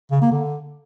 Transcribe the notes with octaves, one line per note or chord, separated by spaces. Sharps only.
C#3
A#3
D3